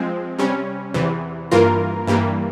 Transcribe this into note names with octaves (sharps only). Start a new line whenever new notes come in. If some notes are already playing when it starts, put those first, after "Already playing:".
Already playing: F3 G#3 C4
C3 G3 C#4
E2 C3 E3
G2 E3 A#3 F4 A#4
G2 E3 G3 A#3